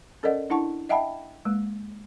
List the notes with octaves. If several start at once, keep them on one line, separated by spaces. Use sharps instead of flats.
C#4 A4 A#4 D5 D#5 F#5
D4 E4 F#5 A5 C#6
D#5 E5 F#5 G5 A5 B5
G#3 A#3